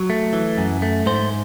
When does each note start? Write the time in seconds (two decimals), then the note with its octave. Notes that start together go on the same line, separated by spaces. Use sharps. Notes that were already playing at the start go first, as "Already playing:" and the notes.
Already playing: F#3
0.10 A3
0.33 E3
0.58 F#2
0.82 A3
1.06 G#2 C5